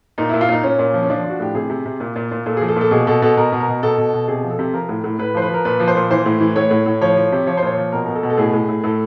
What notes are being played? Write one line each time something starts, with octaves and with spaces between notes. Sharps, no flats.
A#2 D#4
A#2 E4
F4
A#2 D#4
A#2 C#4
A#2
F3
C#4
F3 D4
F3
F#4
A2 G4
C3 G#4
C3
C3
A#2
A#2
A#2
A#2 A4
F3 G#4
A4
A#2
A4
B2 G#4
B2 A4
B2 A4
B2 A#4
B2
A#4
B2
B2 A4
B2
B2
C3 G#4
F3
A4
C3
F3 A#4
A2
A2
A2 B4
F3 C5
B4
F3 A#4
A#2 B4
F3
C5
A#2
E3 C5
A2
E3
A2 C#5
A2
A2
F3 C#5
F3
C3
F3 C#5
C5
A#2 C#5
F3
B2 A#4
B2 A#4
A4
B2
A4
A2 G#4
A2
A2
A2 A4